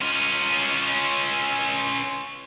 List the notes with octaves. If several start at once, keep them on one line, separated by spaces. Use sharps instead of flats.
C#4 F4